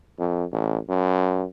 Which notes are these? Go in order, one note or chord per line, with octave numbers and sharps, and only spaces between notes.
F2
A1
F#2